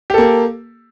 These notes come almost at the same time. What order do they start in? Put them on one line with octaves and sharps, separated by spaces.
G4 A4 A#3